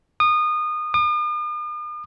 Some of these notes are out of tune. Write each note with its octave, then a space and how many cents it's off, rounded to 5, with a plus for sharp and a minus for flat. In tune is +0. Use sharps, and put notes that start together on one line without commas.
D#6 -25
D#6 -45